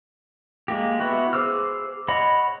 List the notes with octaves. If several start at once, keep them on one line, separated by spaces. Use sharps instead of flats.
G#3 A#3 G4
B3 E4 F#4
G#4 C5 D6 E6 F6
C#5 D#5 F#5 B5